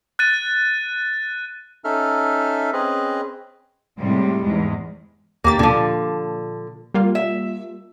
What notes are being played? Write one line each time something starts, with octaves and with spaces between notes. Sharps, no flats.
F#6 A6 D#7
C#4 D#4 A4 E5 F6
C4 C#4 G#4 B4 D#5
A2 C3 G3 G#3
E2 G#2 G#3
D#2 A#3 G4 A6
A#2 D3 F3
G3 A#3 F4
E5